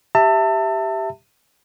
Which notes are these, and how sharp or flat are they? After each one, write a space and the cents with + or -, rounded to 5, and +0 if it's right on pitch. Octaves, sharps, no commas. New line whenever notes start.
G4 +0 E5 +0 A5 +30